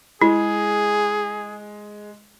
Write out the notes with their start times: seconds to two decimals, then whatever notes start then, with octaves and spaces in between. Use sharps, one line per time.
0.22 G#3 E4 G#4